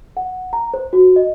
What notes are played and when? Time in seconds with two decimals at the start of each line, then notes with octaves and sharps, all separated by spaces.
0.17 F#5
0.53 A#5
0.74 C5
0.93 F#4
1.16 D#5